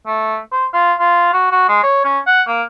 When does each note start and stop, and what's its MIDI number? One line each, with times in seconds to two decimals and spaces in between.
0.06 0.39 57
0.52 0.66 72
0.73 0.94 65
0.99 1.32 65
1.33 1.49 66
1.52 1.65 66
1.68 1.79 56
1.83 2.02 73
2.05 2.19 61
2.27 2.42 78
2.47 2.63 58